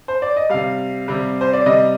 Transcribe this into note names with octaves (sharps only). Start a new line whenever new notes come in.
C5
D5
D#5
C3 G3 F5
C3 G3
C5
D5
C3 G3 D#5